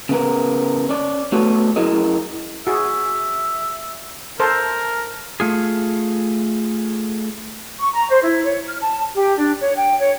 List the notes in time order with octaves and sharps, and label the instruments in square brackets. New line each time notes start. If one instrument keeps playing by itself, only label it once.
[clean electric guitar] C#3 B3 A#4
C#4 D5
A3 B3 F#4 A4 C#5
F#2 E4 G#4 A#4 D#5
[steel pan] F#4 G#4 [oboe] E5
[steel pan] A4 C5 [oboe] A#4
[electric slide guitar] A3 F4 G#4
[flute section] C#6
A#5
C5
E4
C#5
F6
A5
G4
D4
C#5
G5
C#5